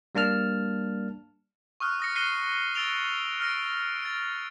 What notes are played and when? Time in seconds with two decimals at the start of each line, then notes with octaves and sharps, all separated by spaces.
0.15 G3 A#3 D4 A5 F6
1.80 C#6 D#6 F6 F#6
2.00 D#6 A#6 C#7
2.16 F#6 A#6 C7 C#7 D#7 G7
2.74 E6 A6 D7 F7 G7
3.40 F6 A#6 D7
4.01 A6 D7